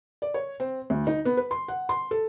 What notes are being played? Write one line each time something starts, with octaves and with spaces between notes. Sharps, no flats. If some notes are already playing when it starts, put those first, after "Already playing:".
D5
C#5
C4
D2
D#4
B3
B4
C6
F#5
C6
A4